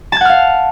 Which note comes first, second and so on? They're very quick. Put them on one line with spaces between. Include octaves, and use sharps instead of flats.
A5 G#6 F#5 F6 F5